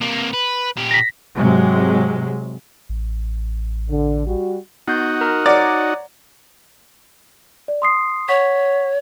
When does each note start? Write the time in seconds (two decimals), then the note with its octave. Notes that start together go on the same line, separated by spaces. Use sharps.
0.01 C3 A#3
0.34 B4
0.77 A#2 G4
0.91 A#6 B6
1.35 G#2 C3 F#3 G#3
2.89 A1
3.89 D3
4.26 G3 F#4
4.88 B3 D#4 F#4 G6
5.21 A#4 A#5 F6
5.46 C#5 D5 F#5 A#5
7.68 D5
7.82 C6 D#6 C7
8.29 C#5 F#5 C#6 B6